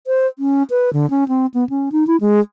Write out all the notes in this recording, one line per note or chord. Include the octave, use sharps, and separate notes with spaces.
C5
C#4
B4
D3
C#4
C4
B3
C#4
D#4
E4
G#3